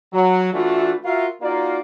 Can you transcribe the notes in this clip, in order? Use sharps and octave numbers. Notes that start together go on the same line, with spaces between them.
F#3
E3 A3 D4 F4 F#4
F4 F#4 A#4 E5 F5
A#3 D#4 F4 F#4 D5 F5